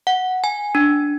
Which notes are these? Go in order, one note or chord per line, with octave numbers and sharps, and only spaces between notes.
F#5
G#5
D4